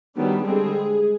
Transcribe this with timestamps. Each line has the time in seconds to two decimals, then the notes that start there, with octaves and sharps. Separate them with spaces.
0.17 D#3 F#3 G3 B3 D4 G4
0.45 D3 G3 G#3 C4 G#4